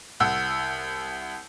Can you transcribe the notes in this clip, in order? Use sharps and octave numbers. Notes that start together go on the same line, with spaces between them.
C2 F#5 E6